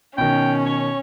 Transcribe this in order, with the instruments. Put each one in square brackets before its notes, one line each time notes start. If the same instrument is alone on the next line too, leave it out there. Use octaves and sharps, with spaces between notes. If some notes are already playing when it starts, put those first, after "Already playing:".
[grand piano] B2 D#3 [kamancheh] C#4 [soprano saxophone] G5
[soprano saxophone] C#5